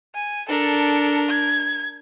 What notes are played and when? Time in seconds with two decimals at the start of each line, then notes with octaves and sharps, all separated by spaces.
0.14 G#5
0.49 D4 A4 A#4
1.29 G#6